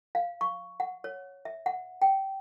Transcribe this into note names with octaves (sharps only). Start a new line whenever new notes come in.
F5
C#6
F#5
C#5
E5
F#5
G5